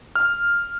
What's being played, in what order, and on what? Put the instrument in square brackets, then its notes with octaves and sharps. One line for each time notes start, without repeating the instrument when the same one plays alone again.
[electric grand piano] F6